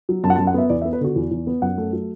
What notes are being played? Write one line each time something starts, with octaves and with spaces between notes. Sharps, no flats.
F#3
F#2 A5
F#5
A5
F#2
F#5
B3 E5
E2 D5
E5
B3
B4
D3 F#4
E2
E2
B3
F#2 F#5
A3
F#3